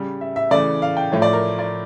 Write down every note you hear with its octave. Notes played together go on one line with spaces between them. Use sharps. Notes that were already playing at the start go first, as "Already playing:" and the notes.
Already playing: C#3 G3
E5
E5
C#3 E3 A3 D5
F5
G5
A2 F3 A3 C#5
D5
A#4
D5